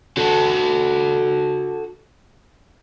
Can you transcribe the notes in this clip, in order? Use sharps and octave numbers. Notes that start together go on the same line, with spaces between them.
F#4 A4